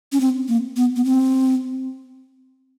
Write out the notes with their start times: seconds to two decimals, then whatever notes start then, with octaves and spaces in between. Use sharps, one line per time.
0.12 C#4
0.20 C4
0.48 A#3
0.77 B3
0.96 B3
1.05 C4